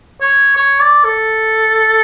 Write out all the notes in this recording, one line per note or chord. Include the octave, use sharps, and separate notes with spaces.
C#5
C#5
D5
A4